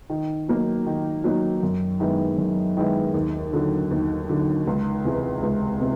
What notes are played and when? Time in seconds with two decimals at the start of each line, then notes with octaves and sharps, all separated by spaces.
0.09 D#3
0.48 F#3 A#3 D#4
0.86 D#3
1.24 F#3 A#3 D#4
1.63 F#2
2.00 D#3 G#3 B3 E4
2.38 F#2
2.77 D#3 G#3 B3 E4
3.14 D#2
3.53 D3 F#3
3.91 D#2
4.29 D3 F#3
4.67 C#2
5.04 C3 E3 G#3
5.43 C#2
5.80 C3 G#3